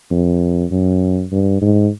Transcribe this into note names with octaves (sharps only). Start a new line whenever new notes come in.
F2
F#2
G2
G#2